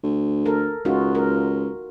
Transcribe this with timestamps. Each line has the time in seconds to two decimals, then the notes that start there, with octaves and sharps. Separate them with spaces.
0.03 D2
0.45 A4 A#4
0.85 C#2 D#4 F4 F#4
1.15 A#4